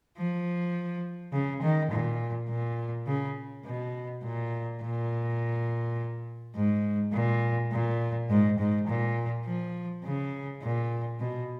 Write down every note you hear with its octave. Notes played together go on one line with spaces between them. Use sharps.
F3
C#3
D#3
A#2
A#2
C#3
B2
A#2
A#2
G#2
A#2
A#2
G#2
G#2
A#2
F3
C#3
A#2
B2